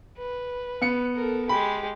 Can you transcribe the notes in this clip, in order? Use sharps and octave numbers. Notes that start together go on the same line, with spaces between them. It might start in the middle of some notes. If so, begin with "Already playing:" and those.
B4
B3 C#7
A4 A#4
G#3 G4 B5